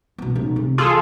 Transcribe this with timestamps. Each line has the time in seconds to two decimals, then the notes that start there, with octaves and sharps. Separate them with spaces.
0.18 B2 B3
0.35 B1
0.56 C3
0.78 E3 F4 G#4 A4